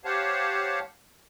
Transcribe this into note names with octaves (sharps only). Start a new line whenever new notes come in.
G4 C5 C#5 F5 F#5 A5